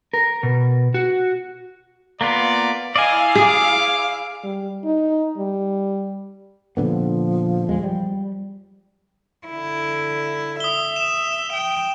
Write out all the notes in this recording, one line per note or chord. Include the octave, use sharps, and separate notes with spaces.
A#4
B2
F#4
A#3 B3 F4 D5
E4 D5 D#5 F5 G#5
G#4 D6
G3
D#4
G3
A#2 D3 F3 B3
E2 G#3
G3
D3 E4
E5 D#6 G7
E7
G5